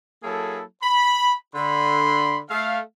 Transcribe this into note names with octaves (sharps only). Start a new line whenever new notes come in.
F#3 A#3 E4 G#4 A4
B5
D3 B5 C6
A3 F5